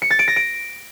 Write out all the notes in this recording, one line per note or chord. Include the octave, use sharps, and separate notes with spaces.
C#7
A6
D7
A#6
D7